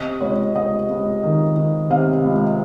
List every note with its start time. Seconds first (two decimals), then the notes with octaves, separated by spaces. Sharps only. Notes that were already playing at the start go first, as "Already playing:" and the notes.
Already playing: C3 D#5
0.21 C#2 C#5
0.55 C#2 D#5
0.89 C#2
1.23 D#3
1.56 D#3
1.90 C3 F5
2.24 C#2